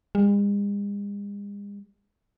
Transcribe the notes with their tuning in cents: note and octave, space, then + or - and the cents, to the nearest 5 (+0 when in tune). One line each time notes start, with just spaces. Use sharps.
G#3 -45